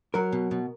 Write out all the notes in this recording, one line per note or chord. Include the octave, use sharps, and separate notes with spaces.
F#3 A#4
B2
B2